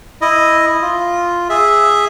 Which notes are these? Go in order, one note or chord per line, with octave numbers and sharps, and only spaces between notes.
E4 D#5
F4
G#4 E5